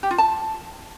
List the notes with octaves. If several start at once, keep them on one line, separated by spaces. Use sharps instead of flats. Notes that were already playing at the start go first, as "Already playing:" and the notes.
G4
F4
A5